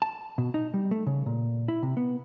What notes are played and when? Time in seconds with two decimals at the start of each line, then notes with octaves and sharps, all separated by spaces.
0.02 A5
0.38 B2
0.54 D#4
0.74 G3
0.91 A3
1.07 C#3
1.26 A#2
1.68 E4
1.83 C3
1.97 B3